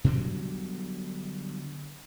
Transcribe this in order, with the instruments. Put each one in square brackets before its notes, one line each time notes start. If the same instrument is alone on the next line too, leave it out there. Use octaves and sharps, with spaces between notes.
[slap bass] B2 D3 F#3 G3